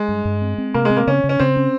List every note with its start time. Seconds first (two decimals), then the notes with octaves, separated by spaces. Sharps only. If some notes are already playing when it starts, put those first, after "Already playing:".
Already playing: G#3
0.08 G2
0.25 G2
0.42 C4
0.58 C4
0.74 C3 A#3
0.85 G#3
0.90 C4
0.97 A#3
1.07 C#3 C#4
1.24 C#3
1.29 C#4
1.39 C#3 C4
1.56 C#4